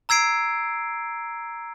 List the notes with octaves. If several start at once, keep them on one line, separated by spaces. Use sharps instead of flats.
A#5 E6 G#6 C7 D7